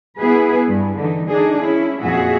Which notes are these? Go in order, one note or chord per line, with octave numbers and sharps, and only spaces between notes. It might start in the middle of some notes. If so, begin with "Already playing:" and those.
B3 E4 G#4 B4
G2
D3 E3 D#4
D4 D#4 G#4
C#4 E4
F2 A#2 F#4 G#4 E5